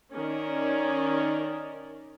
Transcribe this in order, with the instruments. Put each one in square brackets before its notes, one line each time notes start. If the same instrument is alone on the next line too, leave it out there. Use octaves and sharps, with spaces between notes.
[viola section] D#3 C#4 D#4 A#4 D5